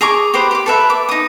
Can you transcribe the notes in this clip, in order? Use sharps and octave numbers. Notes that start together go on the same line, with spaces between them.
G#4 A#5 C#6 D6
G4 B4 C5
G4 D6
A4 B4 E5
D6
D#4 D#6